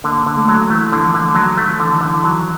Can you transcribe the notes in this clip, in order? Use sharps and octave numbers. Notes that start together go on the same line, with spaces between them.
D3 A#3
D3
A3
F#3
E3 A3
D3 E3
F3
D3
D#3 F#3
A3
F3
D3 E3
D#3
D3 E3
F#3